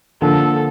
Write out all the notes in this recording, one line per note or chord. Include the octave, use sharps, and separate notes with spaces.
D3 F3 A#3 A4